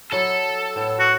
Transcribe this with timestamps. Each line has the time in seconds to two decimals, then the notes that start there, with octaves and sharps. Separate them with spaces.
0.12 F#3 E4 F#4 A4
0.76 A2 B3
0.99 F#4